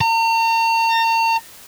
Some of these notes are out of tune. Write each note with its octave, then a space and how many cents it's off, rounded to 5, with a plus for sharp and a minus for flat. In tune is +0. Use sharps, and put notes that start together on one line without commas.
A#5 -40